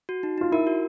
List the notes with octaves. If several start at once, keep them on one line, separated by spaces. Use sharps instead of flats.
F#4
D#4
D#4 F4
E4 A#4
F#4